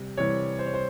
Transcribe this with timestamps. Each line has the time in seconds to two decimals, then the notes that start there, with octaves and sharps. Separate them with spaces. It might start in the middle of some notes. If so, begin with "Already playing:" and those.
Already playing: C3 G3
0.17 C3 E3 G3 C#5
0.59 C5
0.66 C#5
0.74 C5